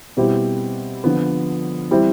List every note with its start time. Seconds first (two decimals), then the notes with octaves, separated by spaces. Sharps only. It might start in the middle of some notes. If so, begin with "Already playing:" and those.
0.17 B2 G3 C4 E4 G4
1.04 D3 F3 B3
1.91 E3 G3 C4 E4